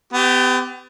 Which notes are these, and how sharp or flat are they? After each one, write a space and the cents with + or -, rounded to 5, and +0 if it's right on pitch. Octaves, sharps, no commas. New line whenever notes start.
B3 +35 G4 +0